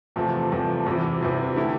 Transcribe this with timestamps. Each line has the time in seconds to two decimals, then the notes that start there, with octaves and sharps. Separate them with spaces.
0.16 E2 C3 F3 A3
0.51 E2 C3 F3 A3
0.86 E2 C3 E3
1.21 E2 C3 E3
1.56 D3 A3 E4 G4